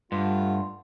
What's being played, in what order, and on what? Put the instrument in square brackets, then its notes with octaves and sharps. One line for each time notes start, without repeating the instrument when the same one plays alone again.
[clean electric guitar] G2 [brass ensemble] G3 A3 F#5 [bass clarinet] F4